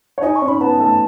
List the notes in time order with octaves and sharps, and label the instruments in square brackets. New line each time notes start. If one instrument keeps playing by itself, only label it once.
[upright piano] C#5
[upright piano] D#4 D#5 [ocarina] G#5
[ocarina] C#6
[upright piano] C#4 C#5
[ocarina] B5
[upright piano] B3 B4 [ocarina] A5
[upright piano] A3 A4